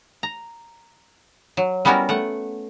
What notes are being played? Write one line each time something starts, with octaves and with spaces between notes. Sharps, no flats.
A#5
F#3
G3 B3 C#4 E4 F#4 A#4
A3 F#5